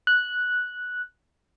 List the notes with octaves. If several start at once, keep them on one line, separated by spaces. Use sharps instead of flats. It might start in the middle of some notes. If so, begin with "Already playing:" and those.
F#6